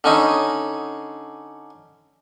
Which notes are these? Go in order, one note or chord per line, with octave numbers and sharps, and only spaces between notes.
D3 C#4 D#4